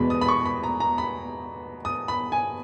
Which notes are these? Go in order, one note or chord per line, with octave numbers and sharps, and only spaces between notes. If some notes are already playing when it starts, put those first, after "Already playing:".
Already playing: E2 B2 G#3 B5
D#6
B5
C#6
B5
A#5
A#5
B5
D#6
B5
G#5